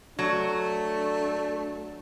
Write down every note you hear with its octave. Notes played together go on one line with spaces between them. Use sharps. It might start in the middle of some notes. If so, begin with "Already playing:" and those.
F#3 A3 D4